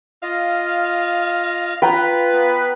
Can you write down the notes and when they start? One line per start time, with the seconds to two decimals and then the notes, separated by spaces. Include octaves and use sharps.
0.23 F4 D#5 F5
1.82 F4 B4 G5 A#5
2.33 B3